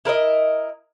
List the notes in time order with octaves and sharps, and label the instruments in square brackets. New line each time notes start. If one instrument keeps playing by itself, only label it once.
[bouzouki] E4 A#4 B4 D#5